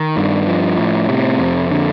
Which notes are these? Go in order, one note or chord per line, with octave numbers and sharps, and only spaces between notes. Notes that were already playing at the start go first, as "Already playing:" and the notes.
Already playing: D#3
G2
F3
A2
C3
F2
D3